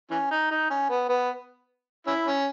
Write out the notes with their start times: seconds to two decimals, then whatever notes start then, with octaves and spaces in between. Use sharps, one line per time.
0.10 E3 C#4
0.31 D#4
0.50 D#4
0.70 C#4
0.90 B3
1.09 B3
2.07 C#4 E4
2.26 C#4